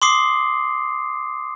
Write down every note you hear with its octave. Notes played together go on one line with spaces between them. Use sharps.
C6 D6 D#6 C7